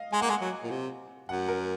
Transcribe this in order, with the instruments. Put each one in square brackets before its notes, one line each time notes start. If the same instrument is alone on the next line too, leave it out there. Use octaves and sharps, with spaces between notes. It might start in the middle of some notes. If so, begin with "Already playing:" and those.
Already playing: [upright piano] D#5 F5
[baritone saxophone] G#3 [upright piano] G#5
[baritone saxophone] A#3 [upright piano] F#5
[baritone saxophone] G#3 [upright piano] G#5
[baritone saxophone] F#3
A#2
C3
[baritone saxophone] F#2 [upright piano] F#5
[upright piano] A#4